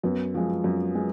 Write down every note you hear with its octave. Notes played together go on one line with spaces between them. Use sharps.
F#2 B3
F3 G#3
F#2
G#3